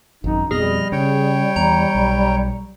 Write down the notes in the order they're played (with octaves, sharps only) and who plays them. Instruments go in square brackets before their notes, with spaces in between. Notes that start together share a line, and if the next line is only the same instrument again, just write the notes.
[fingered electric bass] G#1 F#2 [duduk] D#4
[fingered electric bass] F2 B2 [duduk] G3 [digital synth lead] G#4 [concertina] D#5 F6
[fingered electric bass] C#3 [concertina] C#5 G5
[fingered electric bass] E2 [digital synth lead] A#5
[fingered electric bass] B1